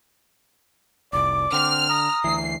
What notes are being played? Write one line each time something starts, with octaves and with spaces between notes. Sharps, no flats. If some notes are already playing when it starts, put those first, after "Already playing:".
F1 C2 D5 D6
D3 C4 F6
A#5 D#6
D2 E3 C7